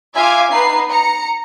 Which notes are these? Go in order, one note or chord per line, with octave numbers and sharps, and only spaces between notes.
F4 E5 F5 G#5 D6
B3 D#4 B4 C7
A#5 C#7